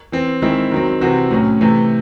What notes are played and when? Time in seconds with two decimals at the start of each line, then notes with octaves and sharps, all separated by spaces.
0.12 E3 C4
0.42 D#3 G#3 C4 E4
0.71 D#3 F#3 C4
1.01 C3 E3 C4 F#4
1.31 A2 F#3 C#4
1.61 C3 E3 A3